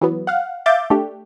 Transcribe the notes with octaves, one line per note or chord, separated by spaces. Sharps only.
E3 F#3 B3
F5 F#5
E5 F5 D6 G6 A6
A3 D4 G4